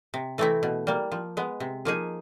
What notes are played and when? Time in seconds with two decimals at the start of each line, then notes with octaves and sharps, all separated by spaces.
0.14 C3
0.38 E3 A3 C4 E4
0.63 B2
0.87 G3 A#3
1.12 F3
1.37 G#3 B3
1.60 C3
1.85 F3 A#3 D#4 G#4